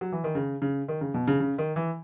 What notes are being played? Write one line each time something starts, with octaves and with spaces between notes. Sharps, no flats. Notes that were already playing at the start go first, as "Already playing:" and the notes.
F#3
E3
D#3
C#3
C#3
D#3
C#3
B2
C#3
C#3
D#3
E3